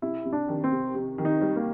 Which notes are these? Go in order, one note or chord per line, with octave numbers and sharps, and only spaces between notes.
C3 E4
C3
D4
D#3
C4
C3
C3
D#3
D#4
G3
A#3